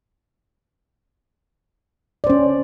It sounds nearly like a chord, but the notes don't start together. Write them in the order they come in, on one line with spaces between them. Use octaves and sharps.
D5 C5 C#4